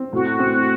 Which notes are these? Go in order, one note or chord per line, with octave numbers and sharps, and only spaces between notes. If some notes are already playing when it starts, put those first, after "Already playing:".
Already playing: C4
A2 F#4
C4